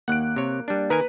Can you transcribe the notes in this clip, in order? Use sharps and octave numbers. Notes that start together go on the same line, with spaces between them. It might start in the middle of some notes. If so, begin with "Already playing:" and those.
D#2 A#3 F#5 F#6 D7
C3 C#5
G3 D4
D#3 A#4 B4 G#5 A#5